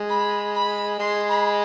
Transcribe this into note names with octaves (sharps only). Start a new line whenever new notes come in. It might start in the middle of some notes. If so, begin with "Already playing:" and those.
Already playing: G#3
B5
B5
G#3 C6
B5